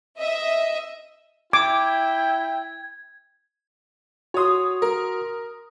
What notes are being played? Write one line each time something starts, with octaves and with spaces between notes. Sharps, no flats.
D#5 E5
E4 G5 D6 G#6
F#4 C#5 C6 D#6
A#4